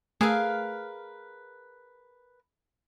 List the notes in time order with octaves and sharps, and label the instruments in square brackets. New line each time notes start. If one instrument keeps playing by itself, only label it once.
[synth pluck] A3 [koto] G#4 [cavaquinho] A#4 B4 F5